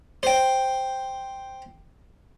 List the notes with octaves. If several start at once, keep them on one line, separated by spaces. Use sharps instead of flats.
C5 G5